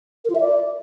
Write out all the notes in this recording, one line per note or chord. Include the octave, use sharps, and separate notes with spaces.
A#4
F4
E5
D5